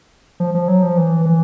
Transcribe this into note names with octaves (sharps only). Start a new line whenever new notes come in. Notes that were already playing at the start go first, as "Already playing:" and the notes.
F3
F3
F#3
F3
E3
E3